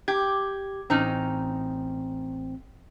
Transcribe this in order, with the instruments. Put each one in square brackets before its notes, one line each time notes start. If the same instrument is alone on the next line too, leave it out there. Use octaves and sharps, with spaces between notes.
[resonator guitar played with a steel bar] G4 [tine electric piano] G#6
[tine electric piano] A1 C4 [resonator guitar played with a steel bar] C#4 D#4 A#5